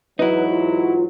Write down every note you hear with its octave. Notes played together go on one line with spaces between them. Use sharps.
G#2 E3 F#3 D#4 E4 B4
F4